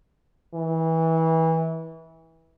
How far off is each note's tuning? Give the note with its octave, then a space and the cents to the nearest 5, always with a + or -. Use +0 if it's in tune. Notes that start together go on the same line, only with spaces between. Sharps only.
E3 -25